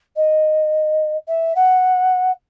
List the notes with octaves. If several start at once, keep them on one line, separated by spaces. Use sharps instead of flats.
D#5
E5
F#5